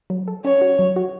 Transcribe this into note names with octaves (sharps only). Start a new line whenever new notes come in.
F#3
A4
C#4 C#5
F#4
F#3
F#4